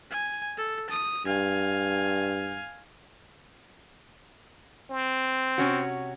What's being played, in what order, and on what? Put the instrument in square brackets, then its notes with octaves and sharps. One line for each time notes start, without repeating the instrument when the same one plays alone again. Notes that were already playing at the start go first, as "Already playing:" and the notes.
[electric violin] G#5
A4
D#6
[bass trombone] G2 [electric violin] F5 G#5
[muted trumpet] C4
[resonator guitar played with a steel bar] C3 C#4 F#4